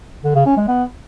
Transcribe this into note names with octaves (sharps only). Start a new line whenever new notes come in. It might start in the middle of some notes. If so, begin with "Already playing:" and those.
D3
C#3
C#4
G#3
B3